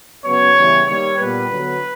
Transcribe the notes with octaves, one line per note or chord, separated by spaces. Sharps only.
C#3 F#3 B3 C#5
C#3 E3 G3 B3
D#3 G3 A#3 C#5
A#2 G3 B3 B4
D3 F#3 B3